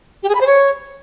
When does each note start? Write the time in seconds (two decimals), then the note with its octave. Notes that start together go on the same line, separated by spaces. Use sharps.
0.23 G4
0.29 G#4
0.35 B5
0.41 C5
0.47 C#5